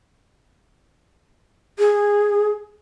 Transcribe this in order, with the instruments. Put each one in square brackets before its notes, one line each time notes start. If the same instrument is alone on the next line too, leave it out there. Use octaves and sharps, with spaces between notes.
[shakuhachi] G#4